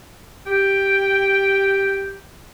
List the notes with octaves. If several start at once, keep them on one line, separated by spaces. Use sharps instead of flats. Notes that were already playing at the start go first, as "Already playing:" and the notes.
G4 G5